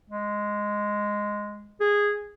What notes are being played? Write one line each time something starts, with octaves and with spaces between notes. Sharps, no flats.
G#3
G#4